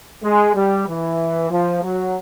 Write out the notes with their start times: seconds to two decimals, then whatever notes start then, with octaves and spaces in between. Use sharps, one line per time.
0.23 G#3
0.55 G3
0.87 E3
1.50 F3
1.83 F#3